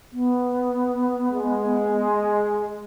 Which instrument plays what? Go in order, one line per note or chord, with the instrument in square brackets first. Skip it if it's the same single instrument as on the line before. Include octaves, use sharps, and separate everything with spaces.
[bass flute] B3
[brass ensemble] G#3